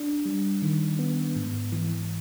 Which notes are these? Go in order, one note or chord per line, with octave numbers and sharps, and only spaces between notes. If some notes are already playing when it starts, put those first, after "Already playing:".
Already playing: D4
G3
D#3
B3
G#2
E3